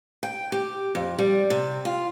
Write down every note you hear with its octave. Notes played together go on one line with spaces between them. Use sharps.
G5
G4
F2
G3
C3
F4